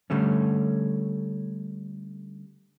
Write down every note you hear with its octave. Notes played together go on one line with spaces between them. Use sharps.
D3 G3 A3 C#4